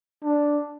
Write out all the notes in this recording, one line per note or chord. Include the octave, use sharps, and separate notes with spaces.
D4